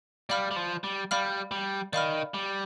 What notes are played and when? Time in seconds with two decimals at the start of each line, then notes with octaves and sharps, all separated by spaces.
0.30 G3 D5 F5 B5 F6
0.51 G3
0.56 F3
0.84 G3
1.11 G3 D5 F5 B5 F6
1.51 G3
1.93 D#3 D5 F5 B5 F6
2.34 G3